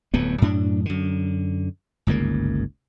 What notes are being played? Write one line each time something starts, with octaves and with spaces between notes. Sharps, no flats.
D1 F2 A2 B3
F#2 A2 D4
F#2 D3
G1 C#2 G#2 A#3